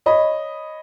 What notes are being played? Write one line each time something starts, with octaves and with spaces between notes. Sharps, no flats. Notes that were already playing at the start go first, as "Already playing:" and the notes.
C#5 D#5 B5